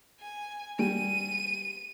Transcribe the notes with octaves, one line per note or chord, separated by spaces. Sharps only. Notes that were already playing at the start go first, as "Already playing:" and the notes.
G#5
G3 D#7